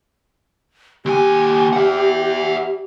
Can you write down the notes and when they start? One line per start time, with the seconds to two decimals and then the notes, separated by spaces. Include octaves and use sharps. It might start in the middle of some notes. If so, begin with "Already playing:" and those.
1.06 D#2 G4 G#5
1.73 E5 F#5